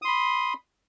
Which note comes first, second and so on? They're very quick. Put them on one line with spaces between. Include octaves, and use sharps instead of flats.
D#6 C6 B5